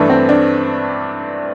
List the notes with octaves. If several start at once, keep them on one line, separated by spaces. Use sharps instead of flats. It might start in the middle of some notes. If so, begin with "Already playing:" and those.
Already playing: G2 E3 A3 D4
C4
D4